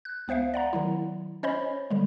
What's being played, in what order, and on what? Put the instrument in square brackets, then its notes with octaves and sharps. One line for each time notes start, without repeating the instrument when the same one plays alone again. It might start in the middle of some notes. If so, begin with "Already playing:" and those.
[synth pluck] F#6
C#2 B3 C5 E5 F5
D5 F#5 A#5
D#3 F#3 E4
C#4 C5 C#5 D#5 B5
D3 G3 G#3